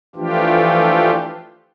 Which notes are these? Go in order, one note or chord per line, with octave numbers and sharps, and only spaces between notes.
E3 F3 A3 D4 F4 G4